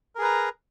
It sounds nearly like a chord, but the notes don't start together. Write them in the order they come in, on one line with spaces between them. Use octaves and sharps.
A#4 G#4 B4 A#5